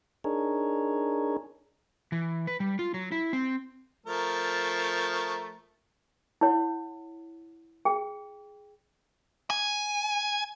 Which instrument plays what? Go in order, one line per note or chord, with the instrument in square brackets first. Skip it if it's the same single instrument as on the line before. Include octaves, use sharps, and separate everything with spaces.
[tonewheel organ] D4 D#4 G#4 A#4 C#5
[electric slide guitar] E3
B4
G3
F4
F#3
E4
C4
[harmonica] F3 A3 A#4
[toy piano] E4 C#5 F#5
G#4 G5
[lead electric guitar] G#5